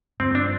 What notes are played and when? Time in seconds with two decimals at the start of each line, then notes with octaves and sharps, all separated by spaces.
0.20 G2 D3 F3 C4
0.35 D4